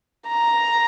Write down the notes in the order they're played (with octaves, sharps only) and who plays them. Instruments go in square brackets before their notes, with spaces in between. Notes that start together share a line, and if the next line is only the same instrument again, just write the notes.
[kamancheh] A#5